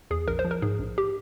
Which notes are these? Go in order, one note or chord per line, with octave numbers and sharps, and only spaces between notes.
E2 G#4
A#1 A#4
C5
F3
A#4
G#2 G#4
A#1
G4